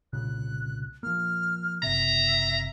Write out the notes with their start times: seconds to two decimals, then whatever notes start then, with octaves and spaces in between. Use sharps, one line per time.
0.13 C2 A#2 C#3 F#6
1.03 F3 A#3 F6
1.83 F#1 C3 E5 A#5